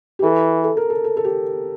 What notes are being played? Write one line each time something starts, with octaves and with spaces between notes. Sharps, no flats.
G4
E3 A4
A4
A#4
A4
A4
A4
G4